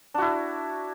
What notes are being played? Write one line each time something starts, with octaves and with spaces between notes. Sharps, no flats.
D4 E4 F#4